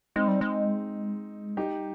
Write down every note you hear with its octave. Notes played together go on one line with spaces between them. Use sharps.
G#3 C4 D#4
G3
G#3
G3 D#4 G4
G#3
G3